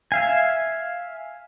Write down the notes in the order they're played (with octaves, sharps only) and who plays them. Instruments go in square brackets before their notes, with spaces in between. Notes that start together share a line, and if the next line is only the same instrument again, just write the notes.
[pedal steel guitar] E5 F5 G#5